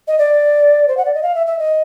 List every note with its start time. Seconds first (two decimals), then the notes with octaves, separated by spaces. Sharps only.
0.07 D#5
0.18 D5
0.88 C5
0.97 F#5
1.05 D5
1.14 D#5
1.22 F5
1.35 E5
1.46 E5
1.58 D#5